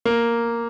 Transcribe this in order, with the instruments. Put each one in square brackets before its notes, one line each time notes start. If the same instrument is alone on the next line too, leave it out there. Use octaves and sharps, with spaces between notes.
[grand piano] A#3